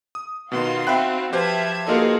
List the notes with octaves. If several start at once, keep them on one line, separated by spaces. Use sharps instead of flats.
D#6
B2 D#3 B3 D#4 F4 F#4 C6
C4 E5 G5 B5 F#6
F3 G4 B4 C5 E5 A5 G#6
A#3 D#4 F4 F#4 G#4 A4